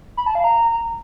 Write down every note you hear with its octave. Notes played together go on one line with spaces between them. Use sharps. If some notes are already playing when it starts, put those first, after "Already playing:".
B5
A5
F5
A#5